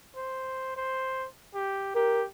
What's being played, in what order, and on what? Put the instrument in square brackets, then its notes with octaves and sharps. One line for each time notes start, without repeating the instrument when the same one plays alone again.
[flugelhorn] C5
C5
G4
[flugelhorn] G4 [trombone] A#4